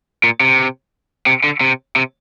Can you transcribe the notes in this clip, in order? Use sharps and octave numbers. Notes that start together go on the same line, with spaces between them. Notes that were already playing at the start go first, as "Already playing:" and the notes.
A#2
C3
C3
D3
C3
C3